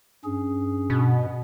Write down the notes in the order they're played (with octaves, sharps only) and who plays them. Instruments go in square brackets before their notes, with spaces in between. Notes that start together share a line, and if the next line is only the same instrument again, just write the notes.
[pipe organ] G2 C#4 G#4
[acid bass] B2